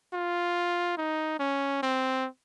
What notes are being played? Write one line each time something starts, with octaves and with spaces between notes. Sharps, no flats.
F4
D#4
C#4
C4